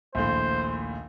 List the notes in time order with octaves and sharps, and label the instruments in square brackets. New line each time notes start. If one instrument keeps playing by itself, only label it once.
[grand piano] A#1 D#2 A2 [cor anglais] C5